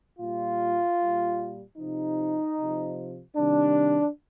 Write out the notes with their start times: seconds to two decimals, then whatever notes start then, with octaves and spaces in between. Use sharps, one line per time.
0.18 A#2 G3 F4
0.97 A#2 G3
1.77 C3 F3 D#4
2.56 C3 F3
3.35 C3 D#3 G3 D4